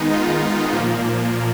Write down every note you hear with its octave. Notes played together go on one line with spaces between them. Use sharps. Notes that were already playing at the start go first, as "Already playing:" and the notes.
Already playing: D#3 G#3 B3 D#4
F4
A#2 F3 A#3